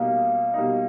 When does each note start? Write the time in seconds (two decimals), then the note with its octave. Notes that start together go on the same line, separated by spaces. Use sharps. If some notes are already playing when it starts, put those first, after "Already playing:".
Already playing: B2 G3 A#3 D#4 F5
0.54 B2 G3 A#3 D#4